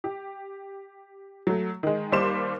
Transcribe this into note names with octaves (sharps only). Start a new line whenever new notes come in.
G4
F#3 A3
D#3 G#3
D#2 G3 C5 C6 D6 E7